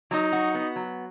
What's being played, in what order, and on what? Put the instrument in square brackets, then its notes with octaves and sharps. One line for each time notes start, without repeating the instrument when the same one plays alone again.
[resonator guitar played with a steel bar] F#3 [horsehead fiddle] D#4
[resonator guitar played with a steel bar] F#4
B3
F#3